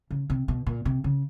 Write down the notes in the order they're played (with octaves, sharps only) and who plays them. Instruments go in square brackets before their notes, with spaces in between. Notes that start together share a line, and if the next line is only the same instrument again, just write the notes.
[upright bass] C#3
C3
B2
A#2
C3
C#3